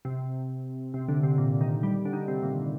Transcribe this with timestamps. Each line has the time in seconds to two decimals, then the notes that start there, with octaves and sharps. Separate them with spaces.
0.05 C3
0.94 C3
1.09 D3
1.23 C3
1.38 A#2
1.61 D#3
1.83 G3
2.05 D3
2.13 D#3
2.28 C3
2.43 A#2